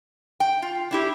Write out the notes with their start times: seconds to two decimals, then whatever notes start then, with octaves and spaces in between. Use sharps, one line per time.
0.40 G5
0.62 F4
0.91 D4 E4 G4